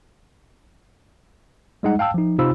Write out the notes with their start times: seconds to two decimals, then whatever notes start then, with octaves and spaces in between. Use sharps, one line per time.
1.83 G3 G#3 D#4 F#5
1.99 F5 G5 A5 E6
2.14 F3 D#4
2.38 C3 D#4 F4 C5 B5 E6